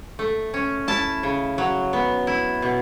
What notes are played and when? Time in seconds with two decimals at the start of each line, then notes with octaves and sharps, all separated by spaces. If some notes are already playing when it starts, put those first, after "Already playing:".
0.19 A3
0.54 C#4
0.88 E4 A5
1.23 C#3
1.58 F#3
1.93 B3
2.27 E4
2.62 B2